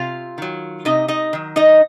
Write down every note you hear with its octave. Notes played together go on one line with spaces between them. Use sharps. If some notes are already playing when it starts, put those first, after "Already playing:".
Already playing: C3 F4 F5
D#3 F#3
C3 D#4 D#5
D#4 D#5
D#3 F#3
D#4 D#5